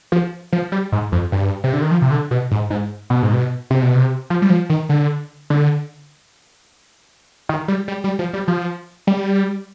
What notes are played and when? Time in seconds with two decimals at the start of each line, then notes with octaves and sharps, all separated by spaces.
0.12 F3
0.52 F3
0.72 G3
0.92 G#2
1.12 F2
1.32 G2
1.64 C3
1.73 D3
1.82 D#3
1.91 F3
2.02 C3
2.11 D3
2.31 B2
2.51 G#2
2.70 G#2
3.10 B2
3.22 G#2
3.33 B2
3.70 C3
3.82 B2
3.95 C3
4.30 F3
4.42 G3
4.50 F3
4.70 D#3
4.89 D3
5.50 D3
7.49 D#3
7.68 G3
7.88 G3
8.04 G3
8.19 F3
8.33 G3
8.48 F3
9.07 G3